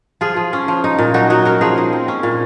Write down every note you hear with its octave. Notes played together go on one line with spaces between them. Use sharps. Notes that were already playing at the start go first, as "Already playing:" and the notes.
F3 F4 G#4
F3
C#4
F3
D#4
A#2
F#3 D#4 F#4
F#3 D#4 F#4
C#4 F#4 A#4
F3 G#4 C5
D#4
C4
C#4
A#2